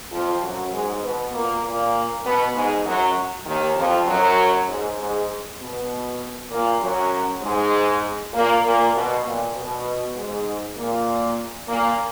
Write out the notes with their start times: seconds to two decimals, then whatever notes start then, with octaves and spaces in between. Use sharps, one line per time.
0.12 F2 F3
0.42 F#2 F#3
0.73 G#2 G#3
1.03 B2 B3
1.34 A#2 A#3
1.64 A#2 A#3
2.25 B2 B3
2.55 G#2 G#3
2.85 F#2 F#3
3.46 D#2 D#3
3.77 F2 F3
4.07 F#2 F#3
4.68 G#2 G#3
4.99 G#2 G#3
5.60 B2 B3
6.51 A#2 A#3
6.81 F#2 F#3
7.42 G#2 G#3
8.33 A#2 A#3
8.64 A#2 A#3
8.95 B2
9.24 A#2
9.55 B2
10.16 G#2 G#3
10.77 A#2 A#3
11.68 A#2 A#3